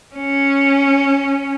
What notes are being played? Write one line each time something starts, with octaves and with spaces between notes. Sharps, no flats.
C#4